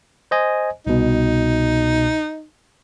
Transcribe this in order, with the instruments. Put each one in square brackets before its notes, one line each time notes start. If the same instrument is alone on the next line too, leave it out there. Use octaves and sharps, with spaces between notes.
[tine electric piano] C5 D#5 G#5
[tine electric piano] C2 B2 [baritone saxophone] D#4